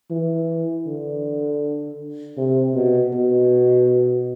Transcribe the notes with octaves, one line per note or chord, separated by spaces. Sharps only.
E3
D3
C3
B2
B2